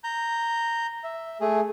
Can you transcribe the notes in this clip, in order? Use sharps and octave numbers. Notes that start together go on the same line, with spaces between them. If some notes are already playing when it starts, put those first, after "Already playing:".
A#5 G6
E5
A3 G#4